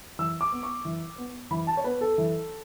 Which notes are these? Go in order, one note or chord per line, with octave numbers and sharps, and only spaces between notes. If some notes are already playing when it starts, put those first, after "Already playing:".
E3 E6
D6
B3
C#6
E3
B3
E3 B5
A5
C#5
B3 B4
A4
E3